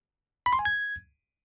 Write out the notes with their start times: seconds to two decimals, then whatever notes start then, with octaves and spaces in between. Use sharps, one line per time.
0.46 B5
0.53 C6
0.59 G#5
0.65 G#6